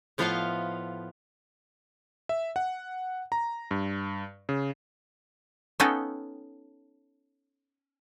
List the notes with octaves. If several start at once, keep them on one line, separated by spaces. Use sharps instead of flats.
A2 F3 B3 F4 D#5 F5
E5
F#5
A#5
G2
C#3
B3 C#4 D#4 A4 F5 G5